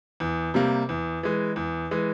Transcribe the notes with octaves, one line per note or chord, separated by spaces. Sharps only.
E2
C3 G3 A#3
E2
E3 G#3
E2
E3 G#3